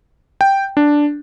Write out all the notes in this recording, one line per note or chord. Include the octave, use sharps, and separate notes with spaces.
G5
D4